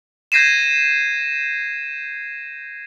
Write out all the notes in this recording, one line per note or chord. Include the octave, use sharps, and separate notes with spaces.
G6 G#6 A#6 C7 D#7 E7